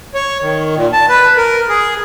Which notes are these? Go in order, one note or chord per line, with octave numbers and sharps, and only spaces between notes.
C#5
D#3
A#2
A5
B4
A#4
G#4